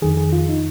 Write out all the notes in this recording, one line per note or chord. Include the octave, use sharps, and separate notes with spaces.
F2 D#3 G#4
G#4
F4
D#4